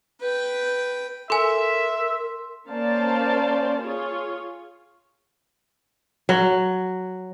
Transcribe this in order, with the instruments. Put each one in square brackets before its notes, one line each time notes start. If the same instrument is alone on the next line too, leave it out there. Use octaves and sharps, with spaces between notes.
[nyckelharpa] B4 G5
[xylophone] A4 G#5 [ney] A#4 [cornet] E5 [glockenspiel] C6 E6
[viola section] A#3 C#4 C5 D5 F5 A5
F4 G#4 C#5
[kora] F#3